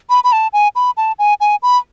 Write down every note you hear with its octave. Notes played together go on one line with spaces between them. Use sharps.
B5
B5
A5
G#5
B5
A5
G#5
G#5
B5